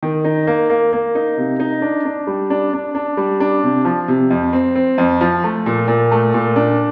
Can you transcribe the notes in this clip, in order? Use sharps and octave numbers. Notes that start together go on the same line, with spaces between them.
D#3
D#4
A#3
A#3
A#3
D#4
C3
D#4
D4
D4
G3
D4
D4
D4
G3
D4
C3
F3
C3
F2
C4
C4
F2
F3
A3
A#2
A#2
A3
A#2
D4